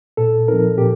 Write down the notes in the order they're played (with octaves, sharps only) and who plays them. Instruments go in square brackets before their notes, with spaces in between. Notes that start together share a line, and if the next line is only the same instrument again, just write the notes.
[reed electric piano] A#2 A4
F3 C4 D#4 A#4
A#2 G4